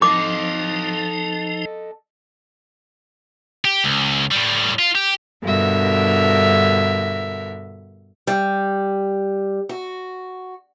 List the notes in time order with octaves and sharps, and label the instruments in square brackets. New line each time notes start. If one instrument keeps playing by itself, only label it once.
[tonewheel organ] F3 D#4 [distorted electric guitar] A4 D#5 [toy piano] D6
[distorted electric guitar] G4
C#2
A2 G3
F4
G4
[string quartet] G2 B2 D3 A#4 E5
[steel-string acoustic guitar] G3
F#4